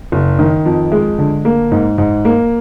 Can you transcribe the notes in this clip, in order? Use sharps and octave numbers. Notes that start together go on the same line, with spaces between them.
F#1
D#3
F2
G#3
D3
A#3
G#2
G#2
A#3